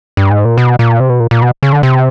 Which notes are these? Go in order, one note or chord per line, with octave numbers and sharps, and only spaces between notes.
G2
G#2
A#2
B2
A#2
C3
B2
A#2
A#2
B2
C#3
D3
C3